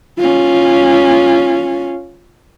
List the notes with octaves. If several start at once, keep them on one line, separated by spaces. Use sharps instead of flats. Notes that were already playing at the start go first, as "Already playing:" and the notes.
C#4 F4